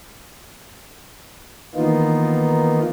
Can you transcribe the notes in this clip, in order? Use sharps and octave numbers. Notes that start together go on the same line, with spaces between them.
D#3 E3 A#3 B3 D#4 F4